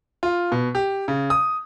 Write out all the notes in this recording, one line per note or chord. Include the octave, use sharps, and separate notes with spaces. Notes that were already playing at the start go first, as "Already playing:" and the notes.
F4
B2
G4
C#3
D#6